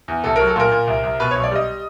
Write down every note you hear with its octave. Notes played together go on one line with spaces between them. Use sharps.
E2
C2 A4
F#3 A#4
A4
A#2 A#4
A#2
C2
C2
B2 B4
B1 C#5
D5
G3 D#5